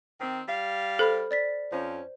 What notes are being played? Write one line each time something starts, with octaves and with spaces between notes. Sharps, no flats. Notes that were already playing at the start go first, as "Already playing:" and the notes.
D#3 C4
G3 F5
A4 C5 B5 F6
D5 A6 B6
F2 F3 C#4 C5